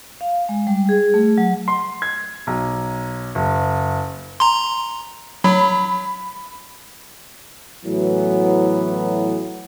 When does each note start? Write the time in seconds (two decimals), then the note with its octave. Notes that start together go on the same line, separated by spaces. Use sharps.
0.21 F5
0.49 G#3
0.67 G3
0.89 G#4
1.14 A3
1.38 F#3
1.68 C6
2.02 G#6
2.47 B1
3.35 F#1
4.40 A#5 C6
5.44 F#3 B5
7.85 A2 E3 F#3 B3